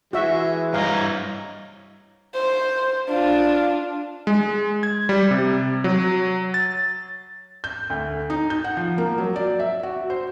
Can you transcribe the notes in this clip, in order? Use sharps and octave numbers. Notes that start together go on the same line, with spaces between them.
E3 G#3 F#4 E5
G2 C#5 D#5 F5 A#5
C5
D4 F4
G#3
G#6
G3
C3
F#3
A6
G6
D2
D#4
G6
F#5
F3
A#3
F#3
D5
E5
F#4
C5